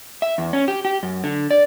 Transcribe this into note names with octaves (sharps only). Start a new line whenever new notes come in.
E5
E2
C#4
G4
G4
F#2
D3
D5